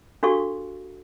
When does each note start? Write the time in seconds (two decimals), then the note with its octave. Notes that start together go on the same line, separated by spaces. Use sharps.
0.23 D4 F#4 G4 A4 F5 C#6